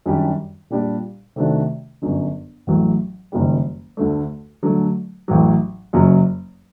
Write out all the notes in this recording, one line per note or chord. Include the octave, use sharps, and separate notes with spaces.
F#2 D#3 G3 D4 G4
A#2 G3 D4 G4
C3 D#3 A3 D4 F#4
G1 F#2 D3
A1 A2 F#3
F#1 F#2 D#3 G3
D2 D3 A3
D3 F#3 A3
A1 A2 F#3
F#1 F#2 F#3